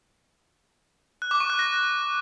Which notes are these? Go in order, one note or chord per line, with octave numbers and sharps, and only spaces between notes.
F#6
D6
C#6
F#6
A#6